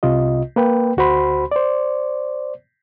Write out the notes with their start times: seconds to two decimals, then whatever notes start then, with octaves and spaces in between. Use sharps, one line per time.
0.03 C2 C3 F4 D#5
0.56 A#3 B4 G5
0.97 D2 F#4 C5 B5 C6
1.51 C5 D5